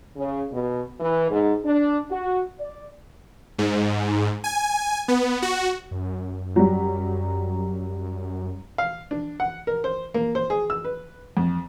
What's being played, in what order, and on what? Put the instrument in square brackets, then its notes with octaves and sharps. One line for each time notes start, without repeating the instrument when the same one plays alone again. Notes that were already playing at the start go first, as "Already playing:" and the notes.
[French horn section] C#3
B2
E3
G#2
D4
F#4
D5
[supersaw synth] G#2
G#5
B3
F#4
[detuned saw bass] F#2
[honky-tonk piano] F#3 G3
[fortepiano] F5
D4
F#5
A#4
C5
A#3
C5
G#4
E6
B4
F2